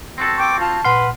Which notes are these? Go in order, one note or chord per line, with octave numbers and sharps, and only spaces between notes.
C4 F#4 A4
G5 C#6 D6 G6
F4 A5
A#2 B4 F#5 C6 F6